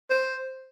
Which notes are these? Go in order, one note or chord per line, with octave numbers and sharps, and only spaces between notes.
C5